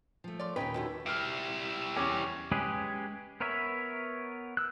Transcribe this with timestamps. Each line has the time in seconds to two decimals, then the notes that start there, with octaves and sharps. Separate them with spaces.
0.24 F3 A3
0.40 F4 C#5 D5
0.56 D#2 A#2 C#4 D#4 B4 G5 B5 B6
0.74 D#3 A3 D#4 E4 F#4 C#5
1.06 G3 E4 F6 C7 D7
1.96 E2 C#4 D6
2.52 G#3 C#4 G4 G#4 B4
3.40 B3 A#4 B4 C#5 E5
4.57 E6 F#6